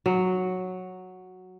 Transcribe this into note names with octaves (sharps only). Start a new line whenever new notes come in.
F#3